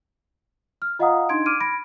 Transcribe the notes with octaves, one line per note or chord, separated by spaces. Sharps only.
F6
F4 D#5 F5 F#5 A#5 D#6
D4 D#4 C6 G#6 D7
D6 F6 G#6 D7 D#7
B5 G#6 A#6 D7